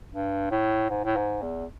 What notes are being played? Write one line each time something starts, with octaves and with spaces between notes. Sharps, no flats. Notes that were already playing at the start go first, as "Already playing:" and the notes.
G2
A2
G#2
A2
G#2
E2